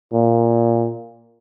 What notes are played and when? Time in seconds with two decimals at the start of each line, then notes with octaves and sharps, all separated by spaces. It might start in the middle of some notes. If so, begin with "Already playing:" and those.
0.13 A#2